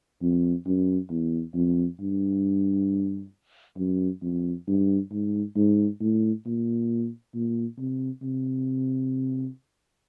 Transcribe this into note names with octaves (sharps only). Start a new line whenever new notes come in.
F2
F#2
E2
F2
G2
F#2
F2
G2
G#2
G#2
A2
A#2
A#2
C3
C3